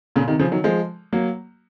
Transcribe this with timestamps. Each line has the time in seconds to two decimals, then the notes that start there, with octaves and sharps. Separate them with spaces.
0.16 A#2 C#3
0.27 C3 D#3
0.39 C#3 F3
0.51 D#3 F#3
0.64 F3 G#3
1.13 F#3 A#3